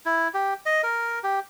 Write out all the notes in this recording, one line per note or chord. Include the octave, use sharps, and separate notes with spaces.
E4
G4
D#5
A#4
G4